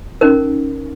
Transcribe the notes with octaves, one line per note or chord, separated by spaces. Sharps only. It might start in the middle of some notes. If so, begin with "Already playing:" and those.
C#4 D#4 A#4